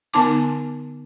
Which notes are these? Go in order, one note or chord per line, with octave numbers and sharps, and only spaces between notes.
D3 B3 D#4 A5 D6